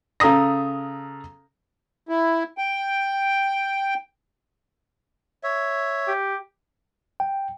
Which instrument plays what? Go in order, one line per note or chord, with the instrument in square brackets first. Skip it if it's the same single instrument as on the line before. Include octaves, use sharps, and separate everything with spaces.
[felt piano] C#3 A4 A#5 D#6 A#6
[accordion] E4
G5
[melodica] C#5 E5
[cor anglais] G4
[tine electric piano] G5